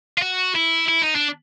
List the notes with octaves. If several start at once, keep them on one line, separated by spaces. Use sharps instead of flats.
F4
F#4
E4
E4
D#4
D4